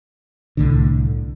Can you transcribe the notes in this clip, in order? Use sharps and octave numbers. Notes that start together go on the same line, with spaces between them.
C2 A2 D3